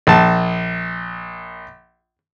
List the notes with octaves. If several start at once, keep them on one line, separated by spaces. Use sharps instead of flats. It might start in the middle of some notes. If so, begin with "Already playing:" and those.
A#1 A5